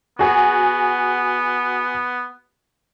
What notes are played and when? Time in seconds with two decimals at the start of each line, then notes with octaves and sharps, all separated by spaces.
0.19 B3 F#4 G#4